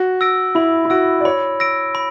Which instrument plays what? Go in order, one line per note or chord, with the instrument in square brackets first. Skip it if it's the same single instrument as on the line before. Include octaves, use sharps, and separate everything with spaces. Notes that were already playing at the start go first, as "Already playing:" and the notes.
Already playing: [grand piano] F#4
[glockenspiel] E6 A#6 D7
[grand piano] E4 [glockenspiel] B5
[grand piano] E4
[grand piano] F#4 [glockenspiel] E6 A#6 D7
[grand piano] D5
[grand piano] C#5 [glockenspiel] B5
[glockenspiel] E6 A#6 D7
B5